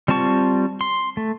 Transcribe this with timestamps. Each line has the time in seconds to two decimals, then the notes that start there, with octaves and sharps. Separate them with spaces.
0.08 G3 C4 F4 A5 C#6
0.81 C6
1.17 A3